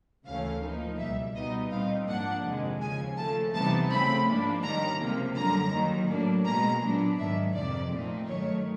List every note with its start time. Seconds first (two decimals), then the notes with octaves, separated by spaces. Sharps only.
0.25 D2 C#3 E3 A3 C#4 F5
0.62 A2 F3 A#3 D#4
0.98 C#2 B2 G3 E5
1.35 B2 G3 B3 D#4 D#5
1.71 A#2 G3 C4 D#4 F5
2.07 G#2 F3 A#3 D4 F#5
2.45 F2 C3 D#3 G#3
2.81 D#2 C#3 F3 G#5
3.17 C#3 F3 A3 A5
3.53 C3 E3 G3 B3 D#4 A5
3.89 C#3 F3 A3 C4 B5
4.27 G#2 F3 A#3 D4
4.63 D#2 D#3 G3 A#5
5.00 C#2 C3 F3 A#3
5.36 F#2 D3 G3 A#5
5.72 D#2 D#3 F#3
6.08 A2 F#3 A#3 D4
6.45 B2 G#3 C#4 A#5
6.82 A#2 F#3 B3 D4
7.18 G#2 D#3 F#3 E5
7.54 F2 C3 D#3 G#3 D5
7.91 A#2 F3 A3 C4 D#4
8.27 G2 D#3 F#3 A3 C#5